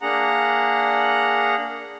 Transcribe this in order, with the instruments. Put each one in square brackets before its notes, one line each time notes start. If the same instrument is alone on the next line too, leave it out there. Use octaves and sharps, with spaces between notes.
[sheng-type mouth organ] A#3 D4 G#4 F#5 A#5